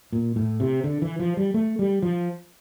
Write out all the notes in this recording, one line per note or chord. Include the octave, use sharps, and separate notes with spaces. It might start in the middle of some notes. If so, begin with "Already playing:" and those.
A#2
A2
C3
D3
E3
F3
G3
A3
G3
F3